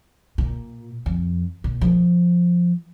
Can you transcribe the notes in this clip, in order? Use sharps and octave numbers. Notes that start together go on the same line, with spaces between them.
A#2
F2
A#2
F3